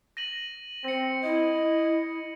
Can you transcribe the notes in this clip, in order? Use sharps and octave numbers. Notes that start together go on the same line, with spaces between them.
A#6 D#7 F#7
C4 A#6 C#7
E4 D#5